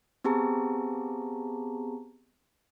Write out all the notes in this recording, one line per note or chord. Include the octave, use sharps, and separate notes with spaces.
B3 C4 G4 G#4 A5 A#5